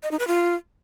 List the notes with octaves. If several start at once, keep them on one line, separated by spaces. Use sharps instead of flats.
D#5
D#4
B4
F4